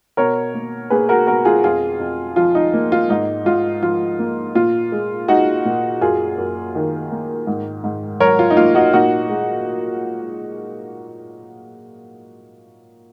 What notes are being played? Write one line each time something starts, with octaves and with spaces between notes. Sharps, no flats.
B2 A#4 C#5
A#3
A#3 G#4 B4
F#4 A#4
B2 F#4 A#4
F4 G#4
F2 F4 G#4
F2
F3 F4
D#4
A#3
F4
G#2 D#4
G#2 F4
F3 F4
A#3
A#2 F4
G#3
G#3 D#4 F#4
A#2
F#2 F4 G#4
F#2
D#3
A#3
G#2
G#2
F#3 A#4 C#5
F4
D#4
A#3 F4
D#4 F#4
A#2 D#4 F#4
G#3